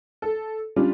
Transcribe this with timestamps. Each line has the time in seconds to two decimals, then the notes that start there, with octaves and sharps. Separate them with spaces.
0.22 A4
0.76 G3 C#4 D4 F4